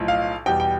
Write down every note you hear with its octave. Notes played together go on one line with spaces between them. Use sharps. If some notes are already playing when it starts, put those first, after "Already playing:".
Already playing: B1 A2 F3
F5
E2 B2 G3 G5
G5